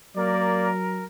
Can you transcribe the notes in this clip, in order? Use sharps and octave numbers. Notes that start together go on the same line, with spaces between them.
F#3 A#3 A#4 D5